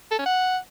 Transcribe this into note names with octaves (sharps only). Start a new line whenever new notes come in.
A4
C#4
F#5